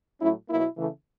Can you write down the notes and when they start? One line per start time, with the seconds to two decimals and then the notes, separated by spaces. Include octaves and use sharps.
0.21 A2 F#3 A3 C#4 E4
0.49 B2 F#3 A#3 E4
0.77 C#3 E3 A3